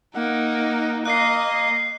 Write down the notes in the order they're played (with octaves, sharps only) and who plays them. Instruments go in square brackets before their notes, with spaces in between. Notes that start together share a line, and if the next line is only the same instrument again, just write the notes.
[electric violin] A#3 D#4 [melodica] F#5
[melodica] A#3 [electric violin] D#5 [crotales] F#6 C7